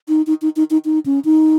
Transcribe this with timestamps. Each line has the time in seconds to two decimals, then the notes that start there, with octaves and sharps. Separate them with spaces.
0.08 D#4
0.27 D#4
0.42 D#4
0.56 D#4
0.71 D#4
0.85 D#4
1.06 C#4
1.25 D#4